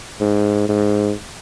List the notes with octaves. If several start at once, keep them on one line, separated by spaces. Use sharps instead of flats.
G#2
G#2